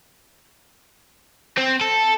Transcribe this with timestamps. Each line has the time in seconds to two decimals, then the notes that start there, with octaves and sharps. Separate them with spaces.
1.58 C4
1.81 A4